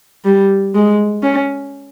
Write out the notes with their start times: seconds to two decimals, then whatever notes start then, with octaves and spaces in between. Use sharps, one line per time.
0.25 G3
0.75 G#3
1.23 C#4